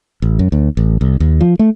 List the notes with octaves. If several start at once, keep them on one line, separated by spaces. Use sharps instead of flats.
A1
F#2
D2
A1
C2
D#2
F3
A3